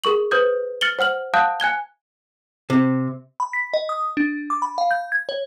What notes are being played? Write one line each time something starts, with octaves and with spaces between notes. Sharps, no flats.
G#4 A#4 C#6 F#7
B4 C5 D#6 G6 G#6
F6 A6 C#7 F#7 G7
C5 F#5 F6 F#7
F5 F#5 A5 D#6 F#6 G6
G#5 F#6 G#6 G7
C3
B5
B6
D#5
D#6
D4
D6
B5
F5
G6
G#6
C#5